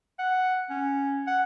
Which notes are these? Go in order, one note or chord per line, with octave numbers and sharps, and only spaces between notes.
F#5
C#4
F#5